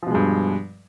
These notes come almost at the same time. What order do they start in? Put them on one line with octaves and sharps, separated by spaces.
F3 B2 G#3 G2